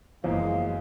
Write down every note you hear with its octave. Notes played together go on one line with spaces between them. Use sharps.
F#1 E2 E3 F3 G#3 A#3 F5